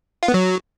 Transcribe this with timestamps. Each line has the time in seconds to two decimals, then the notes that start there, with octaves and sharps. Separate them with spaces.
0.23 F4
0.28 B3
0.34 F#3